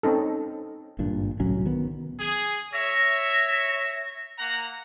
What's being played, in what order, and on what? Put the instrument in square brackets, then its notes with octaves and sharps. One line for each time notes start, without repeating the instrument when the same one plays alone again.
[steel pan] C4 C#4 D#4 A4
[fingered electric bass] G#1 G2 A#2 D4
C2 A2 F#3 C#4
D#3 B3
[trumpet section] G#4
[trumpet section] C#5 E5 [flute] A#6
[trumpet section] A#3 F#5 A#5